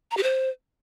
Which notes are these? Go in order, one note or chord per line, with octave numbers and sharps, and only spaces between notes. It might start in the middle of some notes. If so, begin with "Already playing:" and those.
A#5
G4
C5